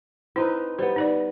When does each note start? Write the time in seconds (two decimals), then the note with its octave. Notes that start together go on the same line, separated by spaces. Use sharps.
0.36 C4 D#4 E4 B4
0.79 G3 B3 C5
0.96 D#4 B4 D5